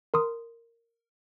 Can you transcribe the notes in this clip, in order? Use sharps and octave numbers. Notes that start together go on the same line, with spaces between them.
A#4 C6 D#6